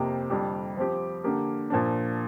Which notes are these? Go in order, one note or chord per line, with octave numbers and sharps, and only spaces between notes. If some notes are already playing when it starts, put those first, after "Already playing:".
Already playing: F2 C3 A#3 G4
F2 D3 G3 D4 G4
F3 C4 G4
D3 A#3 G4
A#2 F3 D4